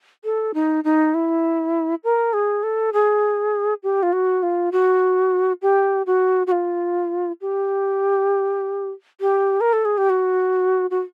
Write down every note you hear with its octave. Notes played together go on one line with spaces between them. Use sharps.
A4
D#4
D#4
E4
A#4
G#4
A4
G#4
G4
F4
F#4
F4
F#4
G4
F#4
F#4
F4
G4
G4
A#4
A4
G#4
G4
F#4
F#4